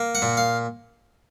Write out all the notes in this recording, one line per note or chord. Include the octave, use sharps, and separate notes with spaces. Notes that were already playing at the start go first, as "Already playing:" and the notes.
Already playing: A#3
F#5
A#2
F5